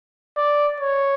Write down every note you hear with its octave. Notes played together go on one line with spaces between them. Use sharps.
D5
C#5